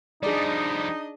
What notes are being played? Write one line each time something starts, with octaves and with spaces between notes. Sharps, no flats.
F3 G3 D4 D#4 G#4 D5 D#5